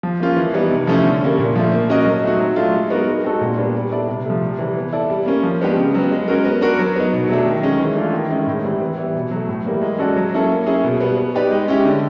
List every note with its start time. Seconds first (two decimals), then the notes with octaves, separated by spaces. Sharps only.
0.03 F3
0.20 A#3 C#4 F4
0.36 E3
0.54 G3 B3 D#4
0.70 C3
0.87 F3 A3 C#4 E4
1.04 D3
1.21 G3 A#3 C#4
1.39 A#2
1.56 F3 A3
1.72 A#3
1.89 C#4 F#4 A#4 D#5
2.06 F#3
2.23 A3 C4 D#4 F#4
2.39 F#3
2.56 A3 D4 F4
2.73 G#3
2.90 B3 D#4 F#4 A#4
3.07 G#3
3.24 C4 D#4 F#4 A4
3.41 A#2
3.58 G3 B3 D4
3.75 G3
3.91 B3 E4 A4 D5
4.08 C3
4.25 F3 A3
4.42 C3
4.59 E3 G3
4.76 B3
4.93 E4 A4 D5
5.10 G3
5.26 A#3 C#4
5.43 F3
5.61 G#3 B3 D4 G4
5.77 C#3
5.95 F#3 B3
6.11 G#3
6.28 C#4 F#4 A#4
6.45 B3
6.61 D4 F#4 A#4
6.79 F#3
6.96 B3 D#4
7.13 B2
7.29 F#3 A3 D4
7.46 D#3
7.63 G#3 C#4
7.79 E3
7.96 A3 D4 F4 A4
8.13 D#3
8.30 G#3 C#4 E4
8.47 A2
8.64 E3 G3 C4
8.82 E3
8.98 G3 B3 E4
9.15 B2
9.31 F#3 A3
9.49 A2
9.65 E3 G3 A#3
9.82 G#3
9.98 C#4 F#4 A4 D5
10.16 F#3
10.33 A#3 C#4 E4 A4
10.50 A#3
10.66 C#4 E4 G#4
10.84 B2
11.01 G3 B3
11.17 B3
11.35 D#4 G4 B4 D5
11.51 G#3
11.68 C#4 E4 G4
11.85 D3